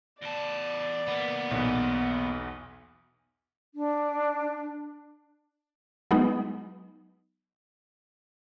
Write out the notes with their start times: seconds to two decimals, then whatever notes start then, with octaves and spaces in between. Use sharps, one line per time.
0.22 E2 D5 A5
1.07 E3 A#3 B3
1.51 B1 E2
3.74 D4
6.11 F#3 G#3 B3 D#4